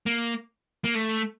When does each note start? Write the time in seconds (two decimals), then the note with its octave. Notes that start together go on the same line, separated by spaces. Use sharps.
0.06 A#3
0.84 A#3
0.95 A3